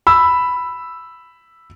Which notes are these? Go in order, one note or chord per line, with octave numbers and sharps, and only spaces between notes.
B5 E6